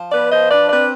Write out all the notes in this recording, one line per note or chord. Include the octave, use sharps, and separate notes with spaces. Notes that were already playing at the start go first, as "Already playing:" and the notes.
Already playing: F3
B3 B4 D5
F3 C5 D#5
D4 B4 D5
C4 B4 D5